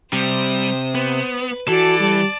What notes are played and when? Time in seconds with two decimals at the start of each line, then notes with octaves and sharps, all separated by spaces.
0.13 C3 G3 C5 D#6
0.95 B3 C5
1.35 B4
1.68 E3 F#4 A4 D5 A5
1.99 G3